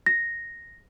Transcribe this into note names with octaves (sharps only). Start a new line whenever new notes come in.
A#6